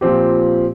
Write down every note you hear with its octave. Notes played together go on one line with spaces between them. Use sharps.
A#2 F3 C4 G4